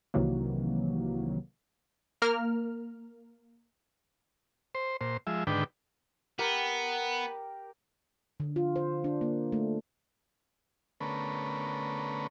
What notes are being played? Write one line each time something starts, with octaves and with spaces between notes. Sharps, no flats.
C2 C3 D#3 E3 F#3 A#3
A#3 A#4 F6
C5
A#2 C5
F3 G#3 E5
G#2 D3 D#3 D4 B4 G5
B3 G4 A#4 G5
D3
F4
C5
D4
A#3
A3
D3 A3 B3 C#4 A#4 B4